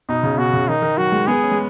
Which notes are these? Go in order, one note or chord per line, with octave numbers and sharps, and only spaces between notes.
B2 D#4
C#3
B2 F#4
C#3
D#3 D#4
D#3
F#3 F#4
G#3
B3 G#4
C#4
G#3